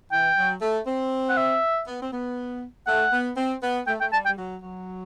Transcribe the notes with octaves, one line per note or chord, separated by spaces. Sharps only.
E3 G5
F#3
A3
C4
F#5
E5
B3
C4
B3
A3 F#5
B3
C4
B3
A3 G5
A3 G5
G3 A5
G5
G3
F#3
F#3